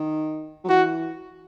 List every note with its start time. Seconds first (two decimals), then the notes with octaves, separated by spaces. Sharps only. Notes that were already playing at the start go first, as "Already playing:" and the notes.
Already playing: D#3
0.64 F#3
0.69 E3 F#4